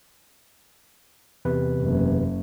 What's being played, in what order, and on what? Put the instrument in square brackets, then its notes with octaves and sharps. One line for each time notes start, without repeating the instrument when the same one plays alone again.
[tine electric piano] E2 C3 B4
[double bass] F#1